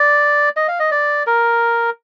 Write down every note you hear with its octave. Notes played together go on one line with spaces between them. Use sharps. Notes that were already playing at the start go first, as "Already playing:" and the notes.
Already playing: D5
D#5
F5
D#5
D5
A#4